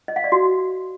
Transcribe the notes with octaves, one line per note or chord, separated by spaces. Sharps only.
D#5
F5
D5
F#4